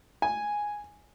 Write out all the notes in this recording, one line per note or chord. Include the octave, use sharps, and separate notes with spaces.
G#5